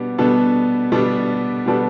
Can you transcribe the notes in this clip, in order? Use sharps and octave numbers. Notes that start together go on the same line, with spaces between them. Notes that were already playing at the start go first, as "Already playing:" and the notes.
Already playing: B2 G3 B3 D4
B2 G3 B3 D4 A4
B2 G3 B3 D4 A4
B2 G3 B3 D4 A4